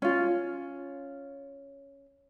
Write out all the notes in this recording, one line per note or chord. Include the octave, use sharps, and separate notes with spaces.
C#4 F4